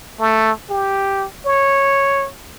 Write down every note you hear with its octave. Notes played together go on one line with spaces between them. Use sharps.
A3
G4
C#5